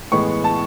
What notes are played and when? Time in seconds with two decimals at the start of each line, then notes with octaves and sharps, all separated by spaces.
0.11 A2 E3 G#3 B3 C#6
0.44 A5